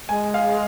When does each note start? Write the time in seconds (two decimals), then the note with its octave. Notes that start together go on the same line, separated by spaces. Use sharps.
0.09 G#3 G#5
0.34 F5